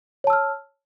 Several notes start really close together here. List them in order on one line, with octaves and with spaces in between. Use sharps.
C#5 A5 E6 F6